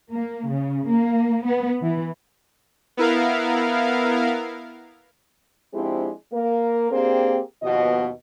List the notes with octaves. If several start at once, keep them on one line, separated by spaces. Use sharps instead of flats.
A#3
C#3
A#3
B3
E3
B3 E4 A#4 F5
F3 G#3 C4 D4 E4 G4
A#3 A#4
A#3 C4 D4 G4 G#4 C5
D#2 B2 F3 B3 D#5